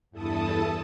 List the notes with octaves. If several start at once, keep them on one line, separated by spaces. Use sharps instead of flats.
E2 G2 E4 A4 A5 D#6